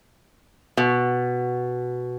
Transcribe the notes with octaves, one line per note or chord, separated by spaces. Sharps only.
B2